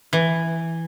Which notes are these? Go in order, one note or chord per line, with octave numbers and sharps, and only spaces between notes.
E3